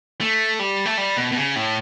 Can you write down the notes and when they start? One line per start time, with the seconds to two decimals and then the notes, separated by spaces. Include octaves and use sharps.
0.21 A3
0.59 G3
0.85 A3
0.98 G3
1.17 B2
1.32 B2
1.37 C#3
1.56 A2